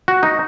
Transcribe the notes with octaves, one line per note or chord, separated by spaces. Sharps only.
F#4
D#4